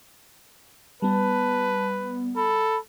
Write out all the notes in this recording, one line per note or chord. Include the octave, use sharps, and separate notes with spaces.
G3 B3 B4 A5
A4 B5